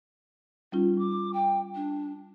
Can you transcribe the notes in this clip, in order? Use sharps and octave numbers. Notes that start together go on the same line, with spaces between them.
G3 C#4 D#4 F4
D6
G5
D4